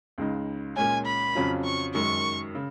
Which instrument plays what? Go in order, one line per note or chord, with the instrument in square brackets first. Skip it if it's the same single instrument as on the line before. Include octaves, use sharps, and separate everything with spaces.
[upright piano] C#2 C#3 G#3 D#4
[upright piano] A#2 G#3 C#4 [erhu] G#5
[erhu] B5
[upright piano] F2 C#3 F#3 C#4 F4
[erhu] C#6
[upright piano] F#2 D#3 G#3 [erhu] C#6
[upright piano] C#3